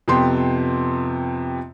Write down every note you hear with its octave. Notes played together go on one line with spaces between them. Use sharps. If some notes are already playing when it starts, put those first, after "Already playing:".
F2 C3 B3 G5 C6